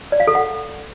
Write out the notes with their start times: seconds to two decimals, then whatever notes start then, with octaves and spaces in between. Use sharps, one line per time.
0.12 D5
0.20 F5
0.27 A4
0.35 F#5